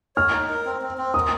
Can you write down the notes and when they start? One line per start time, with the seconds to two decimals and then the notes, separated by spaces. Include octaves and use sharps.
0.16 C#5 F6
0.32 D#4
0.49 A#4
0.66 C4
0.82 C4
0.98 C4
1.14 A#4 D#6